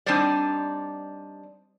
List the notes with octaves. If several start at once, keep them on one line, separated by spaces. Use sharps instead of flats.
G3 C4 D4 D#4 C5 D5